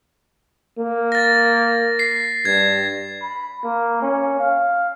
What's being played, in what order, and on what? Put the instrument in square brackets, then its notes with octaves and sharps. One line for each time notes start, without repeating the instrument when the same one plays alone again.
[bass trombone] A#3
[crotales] A6 A#6
C7
[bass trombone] G2 [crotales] G#6
[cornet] B5
A#3
C#4
F5